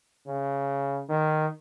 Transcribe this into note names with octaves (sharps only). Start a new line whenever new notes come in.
C#3
D#3